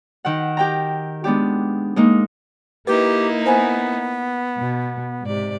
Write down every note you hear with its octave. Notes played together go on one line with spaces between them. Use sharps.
D#3 F#5
G4 G5 A#5
G#3 B3 D4 G4
G#3 A#3 D#4
A#3 D#4 E4 G4 B4
B3 C5 G#5
B2
G#2 C3 D5